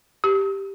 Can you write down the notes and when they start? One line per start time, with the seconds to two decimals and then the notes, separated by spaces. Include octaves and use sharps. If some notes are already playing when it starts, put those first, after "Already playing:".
0.24 G4